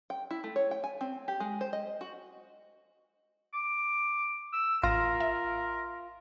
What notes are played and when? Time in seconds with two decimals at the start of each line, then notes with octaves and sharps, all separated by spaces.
0.10 G5
0.31 E4
0.44 A3
0.56 C#5
0.71 G5
0.84 G#5
1.01 C4
1.28 G4
1.40 G#3
1.61 C5
1.73 D#5
2.01 F#4
3.53 D6
4.53 E6
4.84 A1 F4 A#4 A#6
5.20 E5